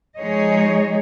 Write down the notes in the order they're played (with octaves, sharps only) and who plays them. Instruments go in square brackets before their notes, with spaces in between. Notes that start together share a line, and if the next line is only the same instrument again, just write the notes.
[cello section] F3 G#3 D#4 G#4 C#5 D#5